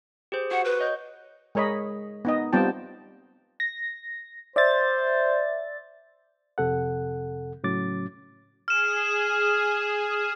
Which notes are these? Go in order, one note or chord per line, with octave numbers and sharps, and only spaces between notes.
G4 G#4 C5
F#4 F#5
B4
C#5 D#5 G6
G#3 A#4 C#5 D#5 B5
B3 D#4 D#5
G3 B3 C4 F4 G5 A5
A#6
C5 D5 E5 A6
F2 C3 A4 F#5
A2 C#3 F#3 C#4 D6 A6
G#4 F6 E7